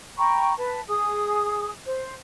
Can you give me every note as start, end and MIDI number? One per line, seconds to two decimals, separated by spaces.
0.17 0.53 79
0.17 0.53 82
0.17 0.53 83
0.17 0.53 85
0.57 0.80 71
0.57 0.80 81
0.89 1.70 68
0.89 1.70 87
1.86 2.14 72